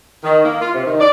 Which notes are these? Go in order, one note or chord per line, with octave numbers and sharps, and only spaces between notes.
D#3
A#3
F4
C3
D#3
D5